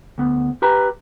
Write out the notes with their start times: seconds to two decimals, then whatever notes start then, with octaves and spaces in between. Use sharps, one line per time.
0.18 D2 B3
0.62 G4 B4 A#5